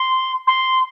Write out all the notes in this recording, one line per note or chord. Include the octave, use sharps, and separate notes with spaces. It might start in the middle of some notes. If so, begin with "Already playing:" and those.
Already playing: C6
C6